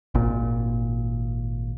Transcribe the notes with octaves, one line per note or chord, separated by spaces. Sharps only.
G#1 A#2